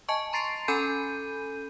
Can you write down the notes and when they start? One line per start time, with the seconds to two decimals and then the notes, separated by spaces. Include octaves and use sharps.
0.08 D#5 G#5 A5 C#6
0.33 A#5 C6 A6 C7 D7 F7
0.68 C#4 A4 G#5 B5 G6 D#7